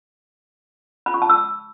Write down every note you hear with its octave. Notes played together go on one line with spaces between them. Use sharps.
B5
C#6
A5
E6